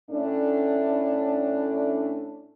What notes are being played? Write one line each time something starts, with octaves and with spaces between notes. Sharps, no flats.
A2 A3 C#4 D4